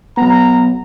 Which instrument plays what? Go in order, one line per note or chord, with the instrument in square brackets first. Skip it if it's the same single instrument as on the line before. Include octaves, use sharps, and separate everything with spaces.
[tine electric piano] F#3 B3 [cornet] A#5